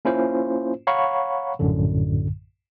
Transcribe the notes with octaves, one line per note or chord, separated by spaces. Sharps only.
A#3 C#4 E4 F4 C5
C#5 F5 F#5 A#5 B5 C#6
A#1 F#2 A2 D3